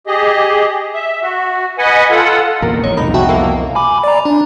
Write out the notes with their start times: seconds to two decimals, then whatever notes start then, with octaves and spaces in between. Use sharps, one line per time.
0.07 G4 G#4 D#5
0.94 E5
1.22 F#4
1.78 B4 D#5 F#5 G#5
2.10 F4 A4 F#5
2.62 E2 A#2 A#4
2.84 A1 A#2 C#5 D#5
2.97 C2 F2 B2 D#4 B5
3.14 F#4 E5 G5 A5
3.29 A#3 A4
3.75 G#5 B5 D6
4.04 D5 A#5
4.25 D4